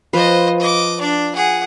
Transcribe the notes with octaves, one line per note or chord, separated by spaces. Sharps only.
F3 B4 C5 D#5
D#5 D6
D4 D5
G#4 F#5